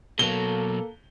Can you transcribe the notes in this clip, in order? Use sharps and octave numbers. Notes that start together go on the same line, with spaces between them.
B2 F#3 A#3 A4 G7